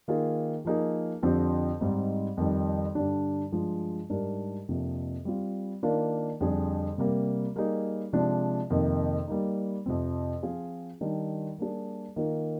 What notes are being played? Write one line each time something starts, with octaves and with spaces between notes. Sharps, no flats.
D#3 A#3 F4 G#4
F3 A#3 D#4 G#4
F2 D3 F3 C4 G4
G#2 G3 C4 D#4
F2 D#3 G3
G2 D3 G3 D4
G2 F3 G#3
G#2 G3 D4 G4 A#4
F2 C3 F3 A#3 D4
G3 C4 F4
D#3 A#3 D4 F4 A#4
F2 D3 G3 D4 G#4
C3 G3 A#3
G3 A#3 D#4 G#4
C3 F3 G#3 D4
F2 C3 D#3 A#3
G3 A#3 D#4
F2 C3 F3 C4
F3 C4 F4 G#4
D#3 G3 D4
G3 A#3 D4 G#4
D#3 A#3 F4 A#4